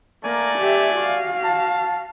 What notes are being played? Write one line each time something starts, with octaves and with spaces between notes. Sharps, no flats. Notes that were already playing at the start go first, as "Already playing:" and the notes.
A3 A#3 A#4 D5 G#5
G4 E5
F#4 F5
A5